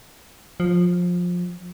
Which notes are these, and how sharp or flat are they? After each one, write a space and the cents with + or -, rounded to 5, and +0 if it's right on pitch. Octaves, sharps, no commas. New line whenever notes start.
F3 +20